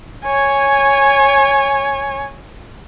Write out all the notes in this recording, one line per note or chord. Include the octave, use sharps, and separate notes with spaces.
C#5 G#5